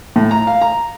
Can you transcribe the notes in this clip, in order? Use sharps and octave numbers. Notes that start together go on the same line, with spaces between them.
A2
A#5
F5
A#5